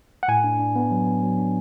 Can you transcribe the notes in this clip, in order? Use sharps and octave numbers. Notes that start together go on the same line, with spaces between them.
F#5
A2 G#5
D4
D4
B3
F#3
B3
F#3
D4